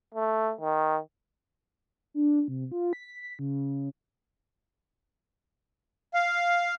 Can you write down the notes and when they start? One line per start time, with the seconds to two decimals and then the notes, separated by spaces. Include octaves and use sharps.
0.14 A3
0.61 D#3
2.14 D4
2.48 C3
2.72 F4
2.93 B6
3.39 C#3
6.14 F5